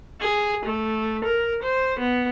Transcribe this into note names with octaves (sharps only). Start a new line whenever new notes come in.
G#4
A3
A#4
C5
B3